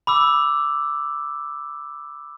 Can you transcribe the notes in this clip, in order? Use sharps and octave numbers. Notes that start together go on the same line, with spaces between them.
B5 D6 E6